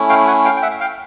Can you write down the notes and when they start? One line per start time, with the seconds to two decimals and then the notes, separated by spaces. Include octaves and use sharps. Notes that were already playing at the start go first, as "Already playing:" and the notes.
Already playing: A3 C#4 E4
0.09 F5 G5
0.27 F#5 G#5
0.45 F5 G5
0.57 G5
0.62 E5 F#5
0.80 F5 G5